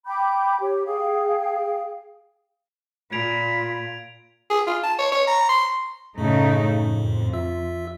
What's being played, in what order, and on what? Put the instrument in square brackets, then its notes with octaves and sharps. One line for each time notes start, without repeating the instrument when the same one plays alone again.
[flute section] G5 B5 D6 G6
G4 C#5
G#4 F5 G5
[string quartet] A#2 [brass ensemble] F4 [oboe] B5 [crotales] G#6 D7 F7
[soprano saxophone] G#4
F4
A5
C#5
C#5
A#5
C6
[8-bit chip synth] F#2 A2 [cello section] C#3 A3 D#4
[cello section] F2
[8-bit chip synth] F4 E5 E6